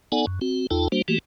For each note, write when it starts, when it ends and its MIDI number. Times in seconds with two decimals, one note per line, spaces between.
0.12 0.26 59
0.12 0.26 63
0.12 0.26 69
0.12 0.26 74
0.12 0.26 78
0.12 0.26 80
0.27 0.39 42
0.41 0.67 60
0.41 0.67 66
0.71 0.88 40
0.71 0.88 63
0.71 0.88 65
0.71 0.88 69
0.71 0.88 79
0.71 0.88 81
0.92 1.02 55
0.92 1.02 58
0.92 1.02 62
0.92 1.02 66
0.92 1.02 72
1.08 1.18 52
1.08 1.18 57
1.08 1.18 58
1.08 1.18 66
1.08 1.18 67